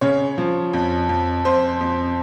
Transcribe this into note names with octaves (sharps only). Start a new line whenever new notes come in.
C#3 C#5
F3
F2
F2
F2 C5
F2